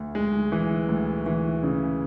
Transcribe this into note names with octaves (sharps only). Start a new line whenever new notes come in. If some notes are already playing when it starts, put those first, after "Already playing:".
Already playing: D2
G#3
E3
D2
E3
C#3